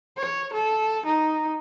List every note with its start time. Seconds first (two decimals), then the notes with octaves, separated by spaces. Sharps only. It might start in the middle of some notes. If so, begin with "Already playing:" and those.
0.17 C#5
0.53 A4
1.05 D#4